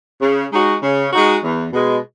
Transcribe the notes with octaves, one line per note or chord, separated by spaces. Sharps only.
C#3
G#3 D#4 F#4
C#3
G#3 D#4 F#4
E2
B2 G#3